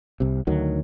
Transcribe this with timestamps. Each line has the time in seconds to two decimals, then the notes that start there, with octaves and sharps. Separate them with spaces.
0.20 C2 C3
0.47 D2 D#3 F#3